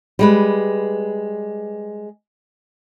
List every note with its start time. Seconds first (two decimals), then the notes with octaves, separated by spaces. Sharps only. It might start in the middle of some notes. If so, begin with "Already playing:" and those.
0.19 G3 G#3 B4